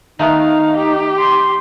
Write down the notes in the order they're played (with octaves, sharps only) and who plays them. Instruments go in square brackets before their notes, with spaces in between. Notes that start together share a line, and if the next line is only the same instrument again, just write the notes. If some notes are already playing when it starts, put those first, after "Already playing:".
[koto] D#3 A3 B3 [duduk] D#4 [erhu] F5
[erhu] G4
[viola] C6